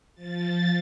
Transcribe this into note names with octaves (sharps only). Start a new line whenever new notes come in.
F3 A6